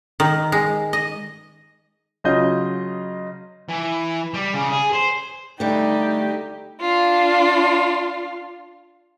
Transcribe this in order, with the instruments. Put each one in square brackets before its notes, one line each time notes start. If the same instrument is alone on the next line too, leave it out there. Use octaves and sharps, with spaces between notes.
[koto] D#3
G#3
D#5
[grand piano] C#3 F#3 F4 D#5 G6
[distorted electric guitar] E3
G3
C#3
G#4
C5
[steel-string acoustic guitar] D3 G3 [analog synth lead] A3 [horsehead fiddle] D#4 G4
[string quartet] D4 F4